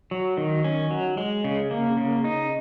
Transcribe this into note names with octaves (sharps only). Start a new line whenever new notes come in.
F#3
D#3
C#4
F#3
G#3
C#3
A#3
C#3
D#4